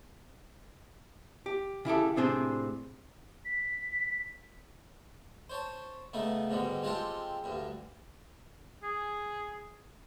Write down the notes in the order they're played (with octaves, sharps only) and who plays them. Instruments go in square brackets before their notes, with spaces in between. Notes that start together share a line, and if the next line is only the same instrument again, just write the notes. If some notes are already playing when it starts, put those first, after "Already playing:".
[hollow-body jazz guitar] G4
C#3 E4 G4 A4
A2 C3 C4 D4 G#4 C5
[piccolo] B6
[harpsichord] C5 C#5 A5
C#3 A3 B3 D#4
G#2 B2 D3 G3
G#3 C4 F4 G4 A4
D2 G2
[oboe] G#4